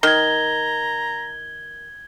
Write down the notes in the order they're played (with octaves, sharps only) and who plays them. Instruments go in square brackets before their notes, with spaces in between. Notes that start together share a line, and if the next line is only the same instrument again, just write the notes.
[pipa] D#3 [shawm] A#5 [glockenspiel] G#6 G7